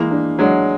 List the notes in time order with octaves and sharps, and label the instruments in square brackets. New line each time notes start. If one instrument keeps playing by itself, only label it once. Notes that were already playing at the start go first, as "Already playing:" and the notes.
Already playing: [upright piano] E3 [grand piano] G#3 A#3
[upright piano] D4
[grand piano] F#3 G#3 [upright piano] D4